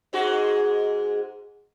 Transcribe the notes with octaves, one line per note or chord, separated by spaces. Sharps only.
G#2 G#3 F#4